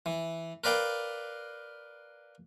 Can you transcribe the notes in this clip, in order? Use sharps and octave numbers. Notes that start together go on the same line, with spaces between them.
E3
A#4 B4 D5 F5 G5